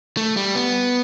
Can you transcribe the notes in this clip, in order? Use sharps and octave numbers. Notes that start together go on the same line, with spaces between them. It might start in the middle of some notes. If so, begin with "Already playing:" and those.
A3
G3
B3